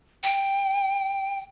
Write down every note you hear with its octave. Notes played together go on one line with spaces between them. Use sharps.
G5